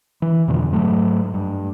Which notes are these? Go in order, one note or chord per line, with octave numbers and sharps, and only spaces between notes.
E3
F2 B2 D3 F#3
G#2 F#3 A3
G2